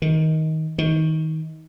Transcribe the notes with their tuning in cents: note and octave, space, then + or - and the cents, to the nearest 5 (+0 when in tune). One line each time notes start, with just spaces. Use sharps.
D#3 +20
D#3 +25